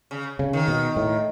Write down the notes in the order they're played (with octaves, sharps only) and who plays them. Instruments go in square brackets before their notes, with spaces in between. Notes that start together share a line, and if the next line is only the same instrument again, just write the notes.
[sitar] C#3
[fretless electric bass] C#3
[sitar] D#3
[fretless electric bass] B2
A2